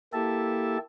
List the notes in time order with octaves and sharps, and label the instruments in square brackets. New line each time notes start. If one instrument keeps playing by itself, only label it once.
[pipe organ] A#3 E4 G4 A4 E5 A5